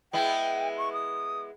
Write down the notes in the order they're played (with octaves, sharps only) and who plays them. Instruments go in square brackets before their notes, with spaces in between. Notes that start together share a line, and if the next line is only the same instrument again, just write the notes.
[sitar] G#3 B3 E4 [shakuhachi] G5
[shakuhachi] C#6
D#6